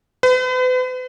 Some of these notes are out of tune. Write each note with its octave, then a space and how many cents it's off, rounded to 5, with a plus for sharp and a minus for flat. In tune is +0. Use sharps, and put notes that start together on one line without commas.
B4 +40